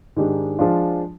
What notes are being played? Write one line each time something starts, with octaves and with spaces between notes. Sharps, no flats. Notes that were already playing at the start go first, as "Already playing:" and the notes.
G#2 D#3 G#3 D4 G4
F3 G#3 D4 F4